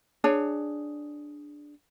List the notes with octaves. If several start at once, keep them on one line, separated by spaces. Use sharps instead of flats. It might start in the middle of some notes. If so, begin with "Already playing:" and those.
D4 G#4 C#5